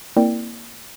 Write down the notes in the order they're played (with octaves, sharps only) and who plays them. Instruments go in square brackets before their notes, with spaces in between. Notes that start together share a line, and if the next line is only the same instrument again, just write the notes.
[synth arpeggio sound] A#3 C4 E4 A#4 D5 G5